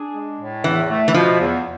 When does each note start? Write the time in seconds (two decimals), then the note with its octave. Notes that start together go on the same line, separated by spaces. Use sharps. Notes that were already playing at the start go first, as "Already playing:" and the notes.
Already playing: D4 G#4
0.14 G#3
0.39 A2
0.64 E2 E3
0.89 A3
1.08 E3
1.14 B2 F3
1.39 E2